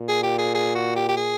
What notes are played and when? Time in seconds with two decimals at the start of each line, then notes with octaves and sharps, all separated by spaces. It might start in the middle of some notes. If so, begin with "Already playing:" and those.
Already playing: A#2
0.08 G#4
0.23 G4
0.38 G#4
0.54 G#4
0.75 F#4
0.96 G4
1.09 G4
1.17 G#4